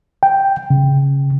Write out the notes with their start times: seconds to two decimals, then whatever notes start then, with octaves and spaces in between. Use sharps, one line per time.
0.23 G5
0.70 C#3